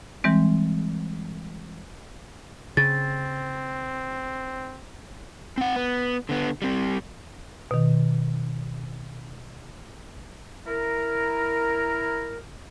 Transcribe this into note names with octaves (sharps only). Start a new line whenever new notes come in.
E3 G3 G#3 C4
C#3 C4 A6
C4 F#5
B3
D3 B3
G3 C4
B2 D#3
E4 A#4